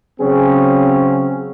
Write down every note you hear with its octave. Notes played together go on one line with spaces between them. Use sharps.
C#3 F#3 C4 C#4 G#4